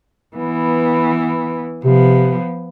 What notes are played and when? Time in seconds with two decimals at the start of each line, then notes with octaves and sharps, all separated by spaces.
0.36 E3 B3
1.85 C3 F3 B3